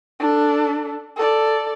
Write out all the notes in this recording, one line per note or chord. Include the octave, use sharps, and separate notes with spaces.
D4 A4
A4 D5